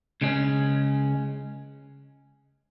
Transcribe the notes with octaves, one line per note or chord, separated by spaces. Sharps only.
C#2 C#3 G#3 C#4